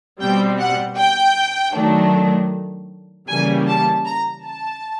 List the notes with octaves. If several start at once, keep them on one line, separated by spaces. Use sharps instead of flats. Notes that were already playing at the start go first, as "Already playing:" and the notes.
B2 G3 C4 G5
F#5
G5
D#3 F#3 A3 D4
C#3 E3 G3 A#3 G#5
A5
A#5
A5